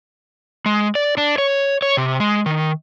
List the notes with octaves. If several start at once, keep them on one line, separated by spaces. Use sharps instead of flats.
G#3
D5
D4
C#5
C#5
C3
G#3
D#3